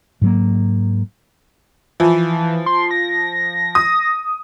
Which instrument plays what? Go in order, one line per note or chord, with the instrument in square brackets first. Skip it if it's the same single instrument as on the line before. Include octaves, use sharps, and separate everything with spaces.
[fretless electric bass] G#2 F#3 A#3
[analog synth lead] E3 [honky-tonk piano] F3
[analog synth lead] C6
A#6
[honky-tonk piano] D#6